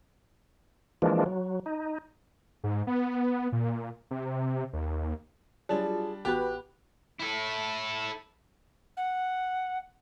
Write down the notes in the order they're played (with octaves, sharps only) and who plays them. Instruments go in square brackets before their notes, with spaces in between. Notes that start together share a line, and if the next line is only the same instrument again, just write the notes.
[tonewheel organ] E3 F3 G#3 A#3 D4
F#3
D#4
[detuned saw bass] G#2
B3
A#2
C3
D#2
[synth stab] F#3 [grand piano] G3 D4 [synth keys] F4 G#4 A5
[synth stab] A1 B3 B4 [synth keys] F#4 F#6 [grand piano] G4
[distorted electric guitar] E4 A4
[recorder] F#5